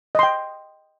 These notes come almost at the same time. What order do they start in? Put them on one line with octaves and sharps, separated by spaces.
D#5 C6 G5